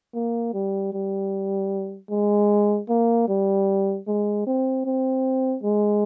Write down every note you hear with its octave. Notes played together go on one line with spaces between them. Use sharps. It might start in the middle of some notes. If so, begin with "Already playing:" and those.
A#3
G3
G3
G#3
A#3
G3
G#3
C4
C4
G#3